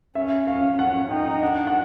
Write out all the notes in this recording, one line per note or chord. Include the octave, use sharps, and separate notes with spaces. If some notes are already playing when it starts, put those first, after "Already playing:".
C#4 E5
C#4 F5
C#4 F#5
D#4 G5
D4 F#5
F#5